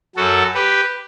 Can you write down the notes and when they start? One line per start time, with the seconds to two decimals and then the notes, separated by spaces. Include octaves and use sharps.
0.16 F#2 F#3 F#4 A4
0.54 G4 B4